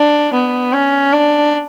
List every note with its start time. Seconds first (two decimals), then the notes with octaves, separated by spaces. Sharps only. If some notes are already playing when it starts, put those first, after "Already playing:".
Already playing: D4
0.33 B3
0.73 C#4
1.13 D4